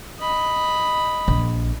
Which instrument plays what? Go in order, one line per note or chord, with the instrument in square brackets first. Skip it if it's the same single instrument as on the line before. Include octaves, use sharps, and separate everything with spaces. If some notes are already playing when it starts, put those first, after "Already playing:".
[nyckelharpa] D#5 B5
[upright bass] A#1